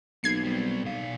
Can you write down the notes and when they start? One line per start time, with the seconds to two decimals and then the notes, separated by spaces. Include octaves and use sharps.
0.24 B1 D#3 A#3 G#6 C7
0.44 G3 C4
0.84 B2 F5